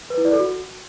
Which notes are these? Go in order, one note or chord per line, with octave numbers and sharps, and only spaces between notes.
B4
E4
D5
A4
F#4